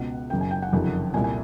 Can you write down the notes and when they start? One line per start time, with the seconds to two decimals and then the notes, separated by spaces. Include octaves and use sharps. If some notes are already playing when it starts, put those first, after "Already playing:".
Already playing: C#2 B2 F#5
0.30 F#1 F#2 C#3 G5
0.41 G#5
0.51 G5
0.62 F#5
0.73 F#1 F2 C3 D#3
1.14 C2 A#2 G#5
1.24 G#5